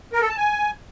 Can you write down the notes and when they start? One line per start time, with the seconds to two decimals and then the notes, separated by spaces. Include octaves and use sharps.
0.13 A#4
0.21 A4
0.29 A5
0.37 G#5